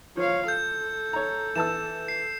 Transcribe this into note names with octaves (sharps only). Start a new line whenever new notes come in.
F3 C#5 F5
A4 G6
C#5 A#5
E3 A5 E6 E7
C7